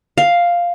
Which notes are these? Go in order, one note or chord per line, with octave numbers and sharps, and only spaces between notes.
F5